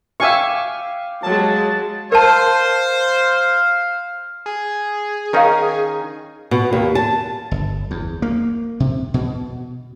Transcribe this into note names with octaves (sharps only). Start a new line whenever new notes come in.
E5 F5 G5 G#5 C#6 D6
F#3 G#3 A5
A#4 C5 F5 A5
G#4
D#3 C#4 D#4 A#4 F5
B2
D#2
A5
G1
E2
A#3
C3
B2